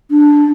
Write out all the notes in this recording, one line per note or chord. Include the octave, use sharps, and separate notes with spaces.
D4